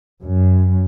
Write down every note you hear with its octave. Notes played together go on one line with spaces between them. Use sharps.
F#2